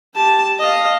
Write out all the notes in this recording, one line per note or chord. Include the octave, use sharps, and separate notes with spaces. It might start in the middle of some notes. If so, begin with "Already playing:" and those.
G4 A5
D#5 F5